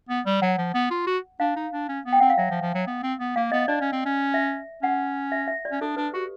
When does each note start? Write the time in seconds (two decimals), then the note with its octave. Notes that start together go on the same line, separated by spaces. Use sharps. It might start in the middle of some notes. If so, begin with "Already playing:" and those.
0.09 B3
0.26 G3
0.42 F#3 F#5
0.58 F3
0.74 B3
0.90 F4
1.07 F#4
1.40 D4 F5
1.56 D#4
1.73 D4
1.88 C#4
2.06 B3
2.13 G5
2.20 C4 F#5
2.30 F5
2.38 F#3 E5
2.51 F3
2.62 F3
2.75 F#3
2.87 B3
3.03 C4
3.20 B3
3.36 A#3 F5
3.52 B3 D#5
3.68 D4 D5
3.81 C#4
3.92 C4
4.05 C#4
4.34 E5
4.82 C#4 F#5
5.32 E5
5.48 E5
5.65 D5
5.72 C#4
5.81 D4 A4
5.96 D4 B4
6.14 F#4 G4